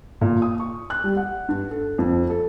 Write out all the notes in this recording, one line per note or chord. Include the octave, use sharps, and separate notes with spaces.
A#2
D#6
C#6
F#6
G3
F#5
G2
A4
F2
A4